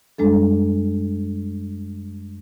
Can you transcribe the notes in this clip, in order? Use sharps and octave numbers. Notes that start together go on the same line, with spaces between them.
F#2 G3 G#3 D4 A4